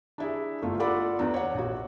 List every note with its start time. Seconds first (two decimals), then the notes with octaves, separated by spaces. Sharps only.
0.18 D4 E4 G#4
0.62 G1 A3 F4
0.80 F4 A4 D5 F#5 B5 D6
1.19 E2 D4 A#5
1.34 C#5 F#5
1.54 A#1 F#4